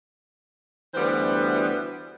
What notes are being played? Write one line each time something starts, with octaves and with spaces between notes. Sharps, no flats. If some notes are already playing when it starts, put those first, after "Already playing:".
D2 E3 G3 B3 B4 C5